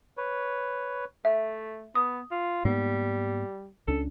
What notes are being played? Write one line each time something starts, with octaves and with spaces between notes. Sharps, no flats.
B4 C#5
A3 E5
B3 D#6
F4
G#2 G3 A#3 B3
C#2 C#4 D4 A4